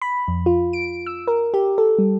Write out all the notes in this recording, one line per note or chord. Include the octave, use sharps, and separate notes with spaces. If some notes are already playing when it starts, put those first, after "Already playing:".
B5
F2
F4
D7
E6
A#4
G4
A4
G3